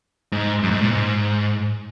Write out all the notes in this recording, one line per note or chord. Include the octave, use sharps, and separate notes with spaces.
G#2
F#2
G#2
A#2
G#2